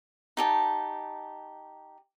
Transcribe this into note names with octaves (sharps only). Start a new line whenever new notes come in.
D#4 G4 A5